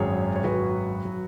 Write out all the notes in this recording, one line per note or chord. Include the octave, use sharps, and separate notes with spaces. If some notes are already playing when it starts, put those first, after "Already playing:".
Already playing: G#1 F#2 F#3 G#4 C#5
C#5
G#1 F#2 F#3 F#4 B4
F#3